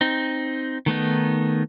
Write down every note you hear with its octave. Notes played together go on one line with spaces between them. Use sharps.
C4 D#4
D#3 A3 B3 D#4